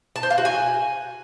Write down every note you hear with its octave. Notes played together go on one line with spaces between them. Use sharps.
A5
C5
F5
F#4
G#5